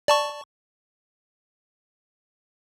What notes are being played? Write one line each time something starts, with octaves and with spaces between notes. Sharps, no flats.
D5 A5 C#6